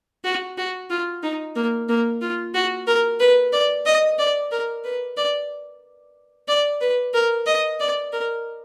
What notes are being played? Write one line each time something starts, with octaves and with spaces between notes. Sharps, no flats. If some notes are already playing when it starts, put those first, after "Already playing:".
F#4
F#4
F4
D#4
A#3
A#3
F4
F#4
A#4
B4
D5
D#5
D5
A#4
B4
D5
D5
B4
A#4
D#5
D5
A#4